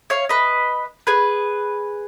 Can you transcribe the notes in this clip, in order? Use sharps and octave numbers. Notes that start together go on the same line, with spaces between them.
C#5 F5
B4 D#5
G#4 B4